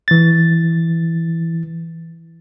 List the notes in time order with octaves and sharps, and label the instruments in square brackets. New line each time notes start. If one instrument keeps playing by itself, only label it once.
[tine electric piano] E3 A6